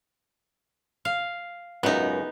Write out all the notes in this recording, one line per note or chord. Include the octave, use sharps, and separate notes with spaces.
F5
C#2 F#2 B3 D#4